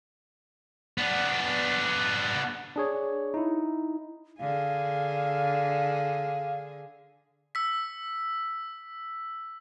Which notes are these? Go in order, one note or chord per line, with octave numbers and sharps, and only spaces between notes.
B3 D4
D4 G#4 C#5
D#4 E4
D3 G#4 F5
E6 B6